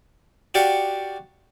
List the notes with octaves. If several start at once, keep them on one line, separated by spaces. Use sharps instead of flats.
F#4 G4 D5 F5 F#5